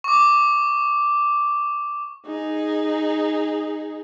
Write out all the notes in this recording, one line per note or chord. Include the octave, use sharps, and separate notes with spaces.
C#6 D6
D#4 G#4